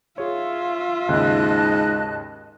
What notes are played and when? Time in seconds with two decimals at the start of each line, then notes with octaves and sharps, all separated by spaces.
0.18 F4 G#4 C#5 E5
1.09 D#2 G#2 C#3 D#5 A5 F#6